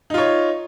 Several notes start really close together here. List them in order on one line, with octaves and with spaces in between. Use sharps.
D#4 F4 C#5